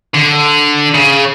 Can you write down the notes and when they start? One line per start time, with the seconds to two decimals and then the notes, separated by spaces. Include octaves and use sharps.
0.14 D3
0.94 C#3